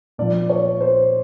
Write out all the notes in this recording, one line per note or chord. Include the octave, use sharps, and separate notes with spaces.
A#2 F3 D5
C#5
C5